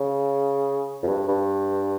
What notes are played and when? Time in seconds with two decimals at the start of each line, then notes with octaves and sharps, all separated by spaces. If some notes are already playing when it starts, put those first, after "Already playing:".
Already playing: C#3
1.03 F2
1.08 G2
1.28 G2